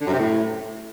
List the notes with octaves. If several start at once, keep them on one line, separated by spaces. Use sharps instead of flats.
D3
F#2
C3
A2